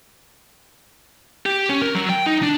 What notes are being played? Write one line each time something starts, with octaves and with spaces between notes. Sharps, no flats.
G4
C#4
A#4
F#3
G5
D#4
D4